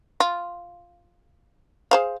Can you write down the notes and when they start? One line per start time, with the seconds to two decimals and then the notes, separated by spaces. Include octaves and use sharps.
0.20 F4
1.91 G#4 C5 F5